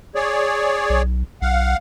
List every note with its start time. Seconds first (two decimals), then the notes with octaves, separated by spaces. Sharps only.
0.15 G#4 C#5 D5
0.90 B1
1.42 B1 F5 F#5